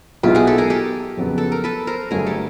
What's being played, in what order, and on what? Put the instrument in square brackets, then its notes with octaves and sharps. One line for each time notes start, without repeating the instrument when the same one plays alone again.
[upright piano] B1 B2 G#3 B3 E4 [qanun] F4 G4
[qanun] F#4 G#4
G4 A4
G#4 A#4
G4 A4
[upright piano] F2 C#3 F#3 B3
[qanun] A4
A#4
A4 B4
A#4 C5
[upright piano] G1 G2 D3 F#3 A3 [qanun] G#4 A#4
[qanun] G4 A4